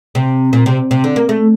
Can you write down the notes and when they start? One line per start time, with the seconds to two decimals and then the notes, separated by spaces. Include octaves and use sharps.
0.15 C3
0.53 A#2
0.66 C3
0.91 C3
1.04 D3
1.16 A#3
1.29 A3